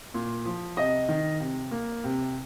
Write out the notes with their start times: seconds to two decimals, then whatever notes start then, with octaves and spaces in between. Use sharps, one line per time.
0.14 A#2
0.45 F3
0.77 C3 D#5
1.09 D#3
1.40 C3
1.71 A#3
2.04 C3